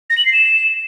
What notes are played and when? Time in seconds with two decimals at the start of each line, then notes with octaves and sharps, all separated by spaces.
0.10 A#6
0.18 F#7
0.25 C7
0.33 E7